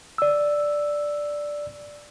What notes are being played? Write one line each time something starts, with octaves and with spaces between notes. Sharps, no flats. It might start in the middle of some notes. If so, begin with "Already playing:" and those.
D5 E6